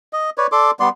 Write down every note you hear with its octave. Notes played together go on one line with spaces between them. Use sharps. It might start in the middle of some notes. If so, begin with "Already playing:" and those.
D#5
B4 C#5 D5
A4 D5 C6 D6
G3 B3 D5 C6